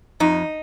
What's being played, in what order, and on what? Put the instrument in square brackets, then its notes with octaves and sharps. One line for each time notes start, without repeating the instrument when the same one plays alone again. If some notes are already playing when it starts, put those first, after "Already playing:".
[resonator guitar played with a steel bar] F2 D#4